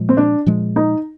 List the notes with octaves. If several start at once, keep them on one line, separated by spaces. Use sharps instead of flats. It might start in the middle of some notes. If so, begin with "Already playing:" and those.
Already playing: A#2 F3 G#3
C4
D4
A#2 F3 G#3
D#4